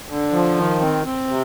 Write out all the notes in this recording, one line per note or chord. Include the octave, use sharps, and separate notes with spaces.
D3
F3
D#3
C4
C4
C3